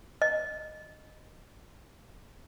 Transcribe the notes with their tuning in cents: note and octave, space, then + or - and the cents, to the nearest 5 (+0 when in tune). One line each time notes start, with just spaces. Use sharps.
D#5 -10